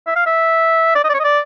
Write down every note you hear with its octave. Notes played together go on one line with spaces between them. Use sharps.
E5
F5
E5
D5
D#5
D5
C#5
D#5
D5